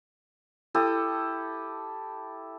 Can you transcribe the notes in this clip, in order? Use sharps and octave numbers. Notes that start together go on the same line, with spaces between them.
E4 G4 A4 D#6